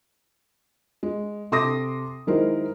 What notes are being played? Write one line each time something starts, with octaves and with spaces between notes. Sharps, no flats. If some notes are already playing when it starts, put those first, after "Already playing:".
G#3
C3 A4 C6 D6 D#6 A#6
D#3 F#3 G#3 E4 A#4 C5